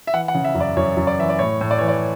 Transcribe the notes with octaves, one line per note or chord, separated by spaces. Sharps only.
E5
E3 F#5
F#5
C#3
E5
F#2
D5
F#2 C#5
F#2
D5
E3 E5
D5
A2 C#5
A2
D5
E3 C#5
D5